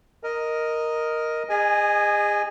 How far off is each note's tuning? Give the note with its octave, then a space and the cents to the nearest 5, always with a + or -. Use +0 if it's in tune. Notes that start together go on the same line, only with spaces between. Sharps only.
A#4 +0 D#5 +0
G#4 -35 D#5 -25 G#5 +0